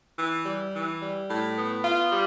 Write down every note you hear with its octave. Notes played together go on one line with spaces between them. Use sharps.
E3
G3
E3
G3
A2
B3
F4
G3